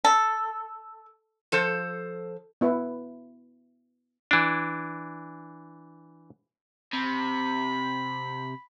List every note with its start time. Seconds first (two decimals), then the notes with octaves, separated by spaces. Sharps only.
0.05 A4
1.52 F3 A4 C5
2.61 B3 E4 B4
4.31 E3 D4
6.93 C3 B5